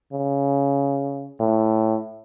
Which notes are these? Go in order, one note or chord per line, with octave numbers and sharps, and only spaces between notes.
C#3
A2